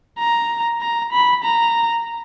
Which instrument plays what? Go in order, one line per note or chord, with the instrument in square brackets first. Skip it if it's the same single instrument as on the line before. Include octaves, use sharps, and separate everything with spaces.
[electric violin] A#5
A#5
B5
A#5